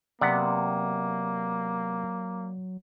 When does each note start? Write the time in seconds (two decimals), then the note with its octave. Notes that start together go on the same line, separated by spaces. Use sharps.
0.21 C3 F#3 A#3 B3 D5 F#5